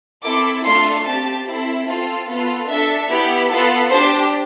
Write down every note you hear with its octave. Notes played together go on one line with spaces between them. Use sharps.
C4 E4 A4 D6
A3 D4 F4 A4 C6
C4 G4 A5
C4 E4 A4
C4 F4 A4
B3 F4 A4
D4 A4 E5
B3 E4 G4
B3 F4 A4
D4 G4 C5